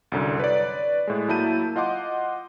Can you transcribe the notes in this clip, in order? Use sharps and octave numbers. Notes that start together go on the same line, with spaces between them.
C2 F#2 D3
B4 C#5 D5
A2 G#3
F#3 A#3 E4 A5 G6 D#7
F4 D#5 F#5 C6 D6